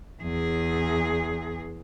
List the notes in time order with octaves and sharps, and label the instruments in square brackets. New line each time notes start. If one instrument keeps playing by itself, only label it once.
[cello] E2 G#4